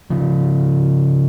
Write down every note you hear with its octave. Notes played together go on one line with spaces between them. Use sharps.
C#3 F3